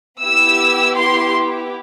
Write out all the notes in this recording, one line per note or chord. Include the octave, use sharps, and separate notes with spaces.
B3 E4 G4 E6
C6